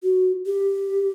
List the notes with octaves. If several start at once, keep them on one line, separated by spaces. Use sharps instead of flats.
F#4
G4